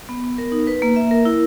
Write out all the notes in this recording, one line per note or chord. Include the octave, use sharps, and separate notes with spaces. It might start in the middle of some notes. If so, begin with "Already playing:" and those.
B3
B3
A#4
D#4
B4
A#3
E5
A#4
E4